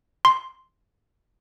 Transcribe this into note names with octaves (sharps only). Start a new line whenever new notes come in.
C6